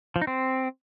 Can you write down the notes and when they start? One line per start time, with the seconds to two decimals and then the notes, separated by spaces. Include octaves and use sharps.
0.16 F3
0.22 D#4
0.27 C4